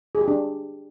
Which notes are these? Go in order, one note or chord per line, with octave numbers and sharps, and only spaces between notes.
G#4
G4
D4